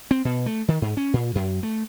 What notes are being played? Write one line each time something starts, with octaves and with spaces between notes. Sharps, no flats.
C4
B2
A3
D#3
G#2
C#4
A#2
F#2
A3